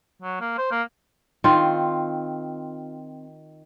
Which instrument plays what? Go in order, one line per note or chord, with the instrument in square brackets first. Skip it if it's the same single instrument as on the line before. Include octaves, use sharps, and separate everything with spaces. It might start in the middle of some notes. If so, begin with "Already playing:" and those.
[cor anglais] F#3
A#3
C5
A#3
[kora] D#3 C4 F4